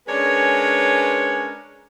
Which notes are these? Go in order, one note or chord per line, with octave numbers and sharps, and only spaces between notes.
G#3 C#4 D4 A#4 B4 C#5